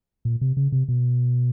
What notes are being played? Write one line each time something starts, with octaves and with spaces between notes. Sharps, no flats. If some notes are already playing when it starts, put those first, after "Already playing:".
A#2
C3
C#3
C3
B2